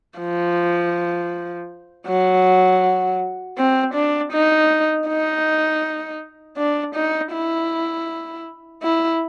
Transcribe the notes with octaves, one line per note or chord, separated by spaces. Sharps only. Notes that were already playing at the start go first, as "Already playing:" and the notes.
F3
F#3
C4
D4
D#4
D#4
D4
D#4
E4
E4